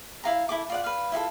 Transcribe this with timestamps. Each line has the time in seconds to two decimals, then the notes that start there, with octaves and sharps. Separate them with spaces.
0.24 E4 F5 A#5
0.49 E4 A4 D6
0.70 F4 D5 F#5
0.84 B4 F5
1.12 E4 F4 G4 A4